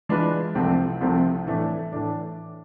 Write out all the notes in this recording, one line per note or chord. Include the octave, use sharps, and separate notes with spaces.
E3 G#3 D4 F4 B4
C2 C3 F3 A3 C4
C2 C3 F3 A3 C4
A2 E3 A3 D4
A2 E3 A3 D4